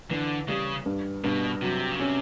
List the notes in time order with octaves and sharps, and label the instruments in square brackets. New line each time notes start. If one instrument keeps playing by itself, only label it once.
[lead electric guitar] D3 [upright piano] E3
[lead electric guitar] C#3 [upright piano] G3
[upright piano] G2
[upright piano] G2 [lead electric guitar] B2
[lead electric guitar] C3 [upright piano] F#3
[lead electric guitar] C#3
[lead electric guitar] C3 [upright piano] C#4